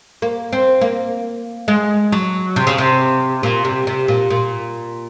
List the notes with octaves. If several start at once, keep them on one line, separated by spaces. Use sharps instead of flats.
A#3
C4
A#3
G#3
F#3
C3
C#3
C3
A#2
C3
C3
A#2
A#2